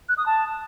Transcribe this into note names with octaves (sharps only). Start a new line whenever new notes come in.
F#6
D#6
A5